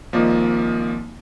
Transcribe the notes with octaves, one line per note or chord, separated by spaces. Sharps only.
G#1 F3 A#3 D5 D#5